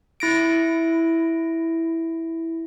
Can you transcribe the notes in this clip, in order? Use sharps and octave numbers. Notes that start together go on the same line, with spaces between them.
E4 A#6 D7